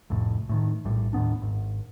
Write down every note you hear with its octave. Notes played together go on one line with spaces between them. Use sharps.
C2 F2 A2
A2 D3 D#3
A#1 A2 G3
D#2 A2 B3 D4
G#1